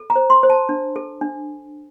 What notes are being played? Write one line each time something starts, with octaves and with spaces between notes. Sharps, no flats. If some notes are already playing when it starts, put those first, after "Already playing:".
Already playing: A4
A#5
C5
C6
C5
A5
D4
A4
D4